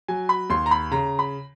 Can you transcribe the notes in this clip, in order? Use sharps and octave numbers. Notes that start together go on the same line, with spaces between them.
F#3 G#5
B5
D#2 C6
A#5
B5
C#3 A#5
B5